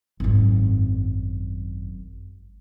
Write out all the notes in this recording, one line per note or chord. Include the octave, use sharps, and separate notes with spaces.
G#1 F#2